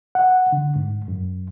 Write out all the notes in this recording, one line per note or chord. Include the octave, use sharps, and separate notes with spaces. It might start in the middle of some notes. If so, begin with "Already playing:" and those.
F#5
D3
G#2
F#2